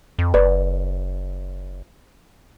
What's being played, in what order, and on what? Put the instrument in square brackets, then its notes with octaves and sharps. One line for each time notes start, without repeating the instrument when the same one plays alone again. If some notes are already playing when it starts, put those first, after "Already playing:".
[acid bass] F2
[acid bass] F#1 [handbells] B4 D5